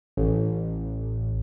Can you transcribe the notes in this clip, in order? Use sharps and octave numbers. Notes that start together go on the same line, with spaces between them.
A1